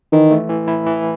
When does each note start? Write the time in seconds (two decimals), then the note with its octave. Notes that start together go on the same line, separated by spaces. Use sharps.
0.12 D#3 E3
0.31 A3
0.50 E3
0.68 E4
0.86 E3